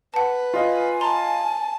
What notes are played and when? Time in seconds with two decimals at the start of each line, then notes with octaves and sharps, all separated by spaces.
0.14 B4 F#5 A5
0.54 F4 D#5 G#5
1.01 A5 A#5 C6